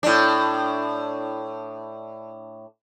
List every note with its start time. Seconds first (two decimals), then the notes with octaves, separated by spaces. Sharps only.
0.03 A2 D4